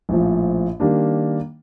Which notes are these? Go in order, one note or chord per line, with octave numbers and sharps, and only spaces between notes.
A#1 A2 F3
D#3 G3 A#3 D4